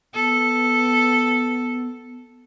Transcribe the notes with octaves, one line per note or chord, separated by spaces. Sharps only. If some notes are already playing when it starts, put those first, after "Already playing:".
B3 A4